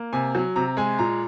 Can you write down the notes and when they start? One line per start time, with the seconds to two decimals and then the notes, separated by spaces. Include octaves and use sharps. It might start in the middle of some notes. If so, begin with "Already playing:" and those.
Already playing: A#3
0.13 C3 G#5
0.35 F#3
0.56 C3 A#5
0.77 G#3 G#5
0.99 A#2 A#5